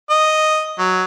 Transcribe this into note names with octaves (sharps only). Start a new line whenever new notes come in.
D#5
F#3